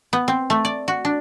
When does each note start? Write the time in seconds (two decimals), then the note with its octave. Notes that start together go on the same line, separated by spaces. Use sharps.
0.13 B3
0.28 C4
0.50 A3
0.65 D5
0.88 F#4
1.05 D4